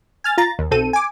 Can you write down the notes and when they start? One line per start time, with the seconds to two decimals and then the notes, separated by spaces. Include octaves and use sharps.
0.24 G#5 F6 A6
0.37 F4 A#5 A6
0.59 D#2
0.71 B1 C4 A4 D#7
0.93 G#5 D6